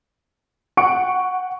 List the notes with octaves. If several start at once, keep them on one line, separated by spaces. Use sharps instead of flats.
F#5 G5 C#6 C#7 D7